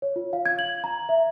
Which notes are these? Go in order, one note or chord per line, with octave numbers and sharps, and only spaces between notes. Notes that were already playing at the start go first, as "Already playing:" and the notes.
C#5
F4
F5
G#6
F#7
A#5
E5